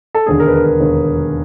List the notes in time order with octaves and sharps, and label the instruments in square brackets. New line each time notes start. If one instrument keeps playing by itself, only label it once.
[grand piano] A4
E1 D#2 D3 G#4
A#4
B4
A#4
A#4
E1 D#2 D3